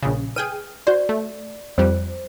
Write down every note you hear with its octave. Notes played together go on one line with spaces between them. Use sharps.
A#1 C#3
G#4 B4 G5 D#7
F#4 C5 D5
A3
F2 G3 C5